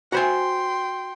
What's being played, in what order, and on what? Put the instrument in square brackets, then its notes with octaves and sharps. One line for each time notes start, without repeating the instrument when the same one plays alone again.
[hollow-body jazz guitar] F#4 C5 G#5 [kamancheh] G5 C6